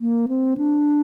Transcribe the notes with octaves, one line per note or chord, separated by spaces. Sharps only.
A#3
C4
D4